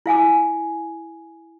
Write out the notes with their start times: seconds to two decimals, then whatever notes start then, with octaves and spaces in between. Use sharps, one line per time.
0.06 E4 F5 G#5 D6